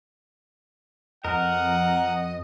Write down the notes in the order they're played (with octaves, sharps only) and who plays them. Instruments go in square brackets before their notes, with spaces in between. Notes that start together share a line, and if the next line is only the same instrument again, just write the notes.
[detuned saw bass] F2 [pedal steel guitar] A#4 [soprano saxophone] D#5 [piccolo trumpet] F#5